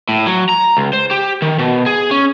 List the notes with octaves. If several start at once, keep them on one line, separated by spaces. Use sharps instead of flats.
A2
F#3
A#5
C#2
C5
G4
D#3
B2
G#4
C#4